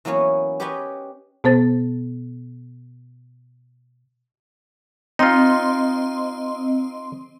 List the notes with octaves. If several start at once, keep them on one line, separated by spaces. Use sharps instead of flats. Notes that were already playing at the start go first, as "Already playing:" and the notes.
E3 F#3 A#3 B3 C#4
G4 B4 C#5 D#5 G5 G#5
B2 B3 C5 A6
C4 D#4 F4 D#5 C6